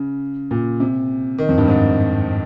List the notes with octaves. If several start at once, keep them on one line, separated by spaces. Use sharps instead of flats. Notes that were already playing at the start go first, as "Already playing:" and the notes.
Already playing: C#3
A#2
C3
D#3
F2
G2
G#2